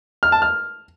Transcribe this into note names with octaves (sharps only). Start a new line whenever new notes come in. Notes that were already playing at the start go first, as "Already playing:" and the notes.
F6
A5
F6